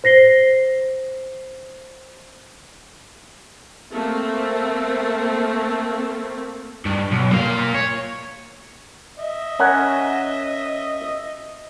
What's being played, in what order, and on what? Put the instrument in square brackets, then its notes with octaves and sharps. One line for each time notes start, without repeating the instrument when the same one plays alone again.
[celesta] C5 A#6 C7 G7
[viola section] A3 A#3 C4
[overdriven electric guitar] G2
B1
A#2 F5
C#5
[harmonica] D#5 E5
[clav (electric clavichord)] C#4 A#4 F#5